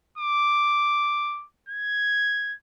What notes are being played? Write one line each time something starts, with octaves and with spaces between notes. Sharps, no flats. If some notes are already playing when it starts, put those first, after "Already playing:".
D6
G#6